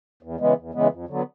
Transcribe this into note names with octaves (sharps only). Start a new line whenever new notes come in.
E2
C#3 E3 G#3 B3
E2
C#3 E3 G#3 B3
F2
D3 F#3 B3